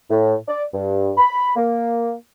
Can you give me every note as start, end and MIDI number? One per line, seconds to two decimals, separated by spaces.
0.10 0.35 45
0.48 0.64 74
0.74 1.12 43
1.18 1.51 83
1.56 2.13 58